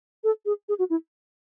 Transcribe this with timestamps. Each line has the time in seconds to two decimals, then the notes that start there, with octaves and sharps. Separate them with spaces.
0.24 A4
0.46 G#4
0.69 G#4
0.79 F#4
0.90 E4